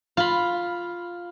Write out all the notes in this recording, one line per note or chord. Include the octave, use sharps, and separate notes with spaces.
F4 B5